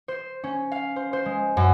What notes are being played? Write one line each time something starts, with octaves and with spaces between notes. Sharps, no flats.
C5
C#4
F5
C5
C5
G#3
F#2